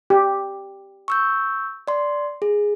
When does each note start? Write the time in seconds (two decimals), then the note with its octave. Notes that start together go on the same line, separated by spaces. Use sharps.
0.10 G4
1.08 C#6 E6 G6
1.88 D5 C6
2.42 G#4